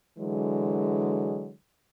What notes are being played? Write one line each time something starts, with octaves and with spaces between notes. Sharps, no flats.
D3 E3 F#3 G#3